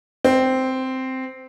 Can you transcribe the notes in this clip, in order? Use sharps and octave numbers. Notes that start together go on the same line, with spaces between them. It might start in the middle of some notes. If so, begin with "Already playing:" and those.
C4